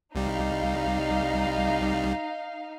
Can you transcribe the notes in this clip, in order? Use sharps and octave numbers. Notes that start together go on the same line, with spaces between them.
C2 G3 D#4 F5